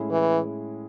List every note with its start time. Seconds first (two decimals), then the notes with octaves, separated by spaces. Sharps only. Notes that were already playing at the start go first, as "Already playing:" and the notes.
Already playing: A2 G#3 C#4 E4 G#4
0.11 E3